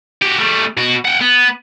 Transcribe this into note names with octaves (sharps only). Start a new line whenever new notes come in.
F#4 G4
G3 A3
B2 F#4
F#5 G5
B3